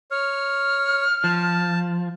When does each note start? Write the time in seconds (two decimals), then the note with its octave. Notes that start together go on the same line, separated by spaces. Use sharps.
0.11 C#5 F6
1.24 F3 A5